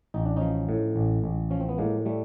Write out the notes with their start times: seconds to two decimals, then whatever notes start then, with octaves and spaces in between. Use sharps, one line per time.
0.14 A1 D#4
0.26 D4
0.37 F3 C#4 D#4
0.69 A2
0.96 A1
1.24 A1
1.51 F3 C#4
1.61 C4
1.69 B3
1.78 A2 G#3 A#3
2.06 G3 A3